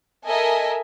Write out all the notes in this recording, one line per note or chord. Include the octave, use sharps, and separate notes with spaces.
A4 A#4 D#5 E5 G#5